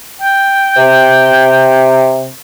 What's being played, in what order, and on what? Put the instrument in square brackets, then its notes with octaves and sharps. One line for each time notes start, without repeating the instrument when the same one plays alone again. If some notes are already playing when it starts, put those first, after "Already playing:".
[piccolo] G5
[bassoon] C3